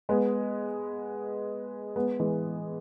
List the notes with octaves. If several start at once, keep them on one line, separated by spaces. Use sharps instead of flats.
G#3 B3
G#3 B3
E3 G#3